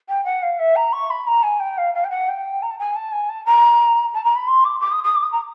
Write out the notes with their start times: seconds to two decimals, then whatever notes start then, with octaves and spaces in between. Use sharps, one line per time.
0.08 G5
0.24 F#5
0.42 F5
0.59 E5
0.75 A#5
0.92 C#6
1.10 B5
1.27 A#5
1.43 G#5
1.59 G5
1.77 F5
1.94 F5
2.04 G5
2.10 F#5
2.28 G5
2.62 A#5
2.70 A5
2.79 G#5
2.95 A5
3.12 G#5
3.29 A5
3.45 A#5
4.14 A5
4.24 A#5
4.35 B5
4.47 C6
4.64 D6
4.80 D6
4.91 D#6
5.04 D#6
5.15 D6
5.23 D#6
5.32 A#5